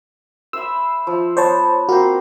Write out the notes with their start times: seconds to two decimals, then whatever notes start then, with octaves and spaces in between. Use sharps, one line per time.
0.53 C5 E5 B5 E6
1.07 F3
1.37 B3 C5 C#5 A5
1.89 A#3 C4 F#4 C5